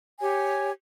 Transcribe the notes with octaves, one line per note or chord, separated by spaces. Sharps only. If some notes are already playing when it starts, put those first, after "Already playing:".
G4 C#5 G#5